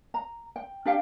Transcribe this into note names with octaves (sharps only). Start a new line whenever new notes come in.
A#5
G5
D4 G4 F5 G5